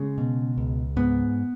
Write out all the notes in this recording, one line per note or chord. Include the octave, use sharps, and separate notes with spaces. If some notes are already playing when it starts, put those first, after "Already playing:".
Already playing: C#3 G#3
B2
C#2
G#2 B3